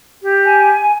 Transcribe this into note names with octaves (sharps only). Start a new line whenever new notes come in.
G4
G#5